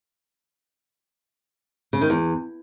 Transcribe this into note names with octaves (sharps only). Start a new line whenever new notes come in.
C#3
D#3
E2